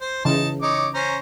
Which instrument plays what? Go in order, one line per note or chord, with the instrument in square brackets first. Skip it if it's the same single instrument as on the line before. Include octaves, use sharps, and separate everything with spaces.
[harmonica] C5
[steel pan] C#3 E3 [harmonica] D#4 A5
[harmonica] D#4 C#5 D6
C#4 C5 A#5